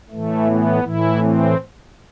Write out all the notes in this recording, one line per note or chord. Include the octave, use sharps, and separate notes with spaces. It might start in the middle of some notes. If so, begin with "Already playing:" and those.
A2 E3 A3
B3
A2 E3 E4
C4